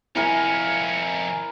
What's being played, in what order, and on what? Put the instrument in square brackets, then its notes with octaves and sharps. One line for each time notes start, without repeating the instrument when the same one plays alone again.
[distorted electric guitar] F2 C#4 [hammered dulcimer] E4 A#4 G#5